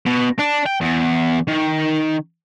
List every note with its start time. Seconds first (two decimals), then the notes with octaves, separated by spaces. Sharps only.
0.06 B2
0.39 D4
0.66 G5
0.80 E2
1.48 D#3